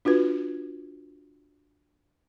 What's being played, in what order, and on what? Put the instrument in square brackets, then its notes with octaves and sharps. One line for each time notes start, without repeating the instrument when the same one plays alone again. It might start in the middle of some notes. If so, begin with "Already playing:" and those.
[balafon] D4 F4 F#4 B4